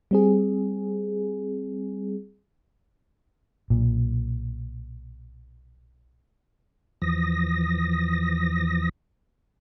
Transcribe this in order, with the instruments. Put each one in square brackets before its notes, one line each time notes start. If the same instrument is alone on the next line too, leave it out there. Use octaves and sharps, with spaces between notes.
[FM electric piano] G3 C4 G#4
[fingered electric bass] B1 A#2
[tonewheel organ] E2 E3 F3 D#6 A#6